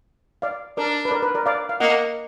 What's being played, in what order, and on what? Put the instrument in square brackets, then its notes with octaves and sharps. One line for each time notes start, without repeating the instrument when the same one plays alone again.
[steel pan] D5 F5
[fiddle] D4 [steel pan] A#4 D5
[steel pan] B4
A#4 D5
B4
A#4 D5
D5 F5
F5
[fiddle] A#3 [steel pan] D#5 F#5